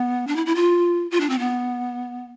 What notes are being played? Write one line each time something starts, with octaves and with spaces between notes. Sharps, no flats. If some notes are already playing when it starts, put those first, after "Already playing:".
Already playing: B3
D4
E4
E4
F4
F4
D4
C4
B3